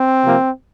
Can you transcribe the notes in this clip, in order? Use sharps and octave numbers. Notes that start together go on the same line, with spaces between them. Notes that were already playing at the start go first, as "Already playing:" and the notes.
Already playing: C4
C3 F3 A#3